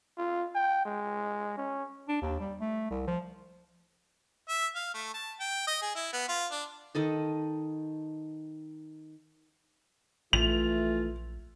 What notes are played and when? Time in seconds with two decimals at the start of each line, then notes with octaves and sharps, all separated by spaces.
0.18 F4
0.55 G5
0.85 G#3
1.58 C#4
2.09 D4
2.22 D#2
2.40 G3
2.61 A3
2.91 C2
3.07 F3
4.49 E5
4.75 F5
4.94 A3
5.14 A5
5.40 G5
5.67 D#5
5.82 G#4
5.95 E4
6.13 B3
6.28 F4
6.51 D4
6.95 D#3 A4 D#5
10.33 A#1 E3 A3 F4 F7